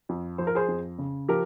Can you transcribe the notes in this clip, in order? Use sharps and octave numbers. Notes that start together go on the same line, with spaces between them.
F2
F3 C5
A#4
G#4 C5
F2
C#3
F3 G4 A#4